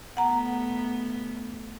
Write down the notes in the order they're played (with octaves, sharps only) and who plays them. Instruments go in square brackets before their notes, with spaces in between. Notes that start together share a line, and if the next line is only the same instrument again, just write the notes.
[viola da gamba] A3 B3 [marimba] F#5 A#5